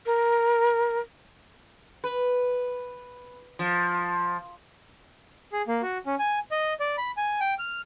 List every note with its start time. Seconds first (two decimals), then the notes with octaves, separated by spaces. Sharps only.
0.06 A#4
2.04 B4
3.59 F3
5.53 G#4
5.68 A#3
5.82 F#4
6.06 C#4
6.19 G#5
6.51 D#5
6.80 D5
6.98 B5
7.17 G#5
7.40 G5
7.59 F6